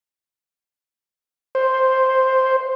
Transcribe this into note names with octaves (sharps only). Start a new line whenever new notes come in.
C5